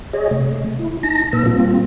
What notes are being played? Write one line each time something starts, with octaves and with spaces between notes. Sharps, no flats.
G#4 C#5 D#5
C3 A3
E4
D#4 A5 A#6
A#2 A#3 B4 E6
G3 A#3 C4 F4